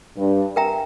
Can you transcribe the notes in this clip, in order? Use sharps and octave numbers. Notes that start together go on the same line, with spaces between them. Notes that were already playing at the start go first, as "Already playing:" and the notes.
G2
A#4 E5 G5 A#5